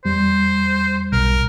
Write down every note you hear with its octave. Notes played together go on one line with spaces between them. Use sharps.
E2 G3 C5
B1 A#4